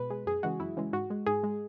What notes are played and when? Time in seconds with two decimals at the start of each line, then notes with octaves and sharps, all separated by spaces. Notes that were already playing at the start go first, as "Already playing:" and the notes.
Already playing: B2 G#3 B4
0.10 G#3
0.26 F#2 G#4
0.43 C#3 E3 G#3 F#4
0.60 F#2 E4
0.77 C#3 E3 G#3
0.93 G#2 F#4
1.10 G#3
1.26 G#2 G#4
1.43 G#3